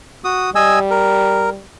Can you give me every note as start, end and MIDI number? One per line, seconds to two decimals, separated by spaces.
0.24 0.50 66
0.24 0.50 87
0.55 1.62 55
0.55 0.79 75
0.55 0.79 80
0.55 0.79 88
0.91 1.50 70